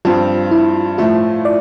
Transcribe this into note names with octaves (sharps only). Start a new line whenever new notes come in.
G2 F3 C4 F4
E4
A2 F3 A3 F4
D5